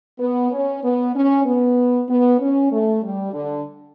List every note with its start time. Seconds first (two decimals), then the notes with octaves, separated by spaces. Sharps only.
0.20 B3
0.51 C#4
0.83 B3
1.14 C#4
1.45 B3
2.08 B3
2.39 C#4
2.71 A3
3.03 G3
3.34 D3